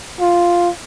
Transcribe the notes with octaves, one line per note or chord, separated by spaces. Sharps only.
F4